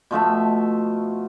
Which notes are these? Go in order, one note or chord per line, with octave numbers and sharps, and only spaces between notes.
B2 F3 A3 E5